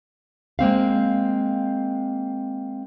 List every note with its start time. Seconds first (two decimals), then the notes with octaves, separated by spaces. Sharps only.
0.59 G#3 A#3 C4 F5